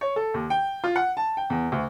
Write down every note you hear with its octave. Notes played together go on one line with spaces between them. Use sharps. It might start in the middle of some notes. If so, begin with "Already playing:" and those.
C#5
A4
D#2
G5
F4
F#5
A5
G5
E2
D2